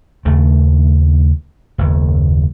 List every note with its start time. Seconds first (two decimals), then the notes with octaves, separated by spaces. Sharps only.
0.25 D#2 C#3 A3
1.78 F#1 D#2